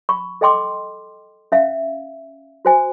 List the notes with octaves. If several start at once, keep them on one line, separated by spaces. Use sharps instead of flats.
B5 C#6
A4 D#5 G5 C6 D6
C#4 E5 F5
F#4 C5 G#5